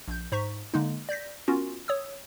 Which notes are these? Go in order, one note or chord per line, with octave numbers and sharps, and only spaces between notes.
A#1 G6
G#2 C5 A#5 C#6 B6
D3 G#3 A#3 D#4
D5 G6 A#6 B6
B3 C#4 F4 F#4 A#4
C#5 D#6 E6